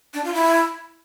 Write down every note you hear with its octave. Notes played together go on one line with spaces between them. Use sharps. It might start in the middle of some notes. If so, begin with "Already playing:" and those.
D4
F4
E4